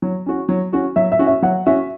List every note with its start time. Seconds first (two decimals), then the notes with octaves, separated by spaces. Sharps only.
0.02 F#3
0.26 C#4 F#4
0.49 F#3
0.73 C#4 F#4
0.96 F#3 E5
1.12 E5
1.19 C#4 F#4
1.27 E5
1.42 F#3 F#5
1.66 C#4 F#4 E5